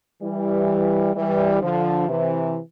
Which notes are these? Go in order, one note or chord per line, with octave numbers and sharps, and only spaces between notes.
E3 G3
E3 G3
D3 F3
C3 E3